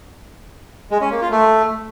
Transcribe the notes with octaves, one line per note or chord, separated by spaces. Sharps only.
G#3
C#4
A#3
F4
A3